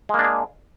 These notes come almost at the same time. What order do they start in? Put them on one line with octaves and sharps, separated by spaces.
G#3 A#3 D4 G#4